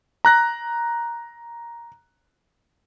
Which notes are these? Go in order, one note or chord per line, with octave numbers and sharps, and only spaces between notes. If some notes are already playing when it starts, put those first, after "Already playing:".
A#5 F#6 A#6